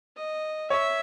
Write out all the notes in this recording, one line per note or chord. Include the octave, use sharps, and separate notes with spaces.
D#5
C#5 E5